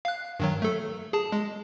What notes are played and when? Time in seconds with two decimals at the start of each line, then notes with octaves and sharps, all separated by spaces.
0.05 F5 F#6
0.40 G2 D#3 F#3
0.62 A3 A4
1.13 G#4 A5
1.32 G#3